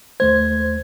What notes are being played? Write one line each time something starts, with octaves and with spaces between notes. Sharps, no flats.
D#2 A3 C5 G#6